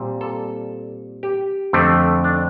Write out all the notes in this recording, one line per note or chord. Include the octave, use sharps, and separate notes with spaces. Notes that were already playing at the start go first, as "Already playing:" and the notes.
Already playing: A#2 G3 C4
A4
G4
F2 D3 A3 C4
D4